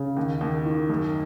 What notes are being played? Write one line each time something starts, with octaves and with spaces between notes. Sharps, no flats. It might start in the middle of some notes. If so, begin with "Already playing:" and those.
Already playing: C#3
D#2
D#2
D#3
F#2